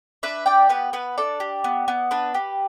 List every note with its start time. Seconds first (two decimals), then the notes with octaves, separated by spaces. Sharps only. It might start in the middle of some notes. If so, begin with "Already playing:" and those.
0.23 D4 B4 E5
0.46 G4 D5 G5
0.69 B3 B4
0.93 B3 B4
1.18 D4 A4 D5
1.40 G4
1.64 B3
1.88 B3
2.11 D4 B4
2.34 G4